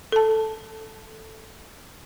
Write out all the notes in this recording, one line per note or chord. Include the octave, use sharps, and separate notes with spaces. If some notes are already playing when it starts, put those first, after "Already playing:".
A4 A5